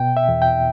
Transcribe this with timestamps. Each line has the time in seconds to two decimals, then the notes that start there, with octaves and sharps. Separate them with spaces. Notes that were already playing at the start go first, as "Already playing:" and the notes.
Already playing: B2 G5
0.17 E5
0.29 E2
0.42 G5